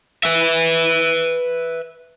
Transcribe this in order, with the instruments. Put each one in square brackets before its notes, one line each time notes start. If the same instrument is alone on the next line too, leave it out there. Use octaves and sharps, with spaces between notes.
[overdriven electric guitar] B4 E5